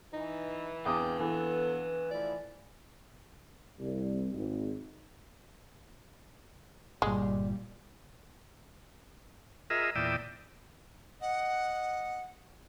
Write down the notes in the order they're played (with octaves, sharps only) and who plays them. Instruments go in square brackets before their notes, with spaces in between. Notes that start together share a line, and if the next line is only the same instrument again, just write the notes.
[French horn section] E3 [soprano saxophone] D#4
[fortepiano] E2 D6 D#6 [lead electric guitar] B4 F5 [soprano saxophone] G5
[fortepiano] E3 [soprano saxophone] B3 [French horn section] A4
[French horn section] F3 A3 E4 [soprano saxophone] D5
[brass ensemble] C2
G#1
[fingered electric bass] G1 A#2 [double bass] G3 [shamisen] G#3
[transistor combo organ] F4 G#4 A#4 D#5 E5
E2 A#2 D5 E5 G5 D#6
[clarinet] D#5 [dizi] F#5